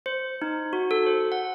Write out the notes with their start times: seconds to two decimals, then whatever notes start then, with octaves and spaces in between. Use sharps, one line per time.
0.06 C5
0.42 D#4
0.73 F#4
0.91 A4
1.06 C5
1.32 F#5